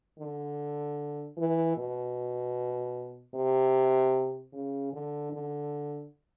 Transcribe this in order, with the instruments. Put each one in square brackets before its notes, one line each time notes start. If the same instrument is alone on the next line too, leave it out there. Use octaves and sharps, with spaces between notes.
[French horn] D3
E3
B2
C3
C#3
D3
D3